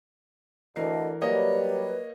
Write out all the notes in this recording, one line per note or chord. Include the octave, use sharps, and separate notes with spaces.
D2 E3 A#4 D#5 C7
F#3 G3 A#3 B4 C#5 D#5